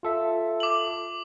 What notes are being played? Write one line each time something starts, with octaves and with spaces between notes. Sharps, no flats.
F4 A4 E5
D6 F#7